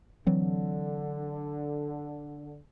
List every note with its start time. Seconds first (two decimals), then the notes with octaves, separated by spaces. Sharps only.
0.27 D3 E3 F#3 C4